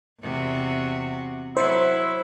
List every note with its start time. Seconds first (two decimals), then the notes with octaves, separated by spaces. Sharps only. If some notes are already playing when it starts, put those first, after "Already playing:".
0.21 E2 C3 F#4
1.57 F#3 E4 C5